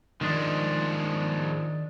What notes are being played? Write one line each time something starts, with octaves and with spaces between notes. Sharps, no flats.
D#3 F3 G#3 D4